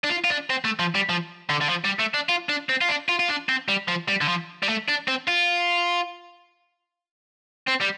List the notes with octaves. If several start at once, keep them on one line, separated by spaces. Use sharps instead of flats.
D4
F4
F4
D4
C4
A3
F3
G3
F3
D3
D3
F3
G3
A3
D4
F4
D4
C4
F4
D4
F4
F4
D4
C4
G3
F3
G3
D3
F3
G3
A3
D4
C4
F4
C4
G3